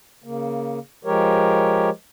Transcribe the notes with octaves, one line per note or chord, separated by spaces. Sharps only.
C#3 A#3
F3 G#3 G4 A#4 C#5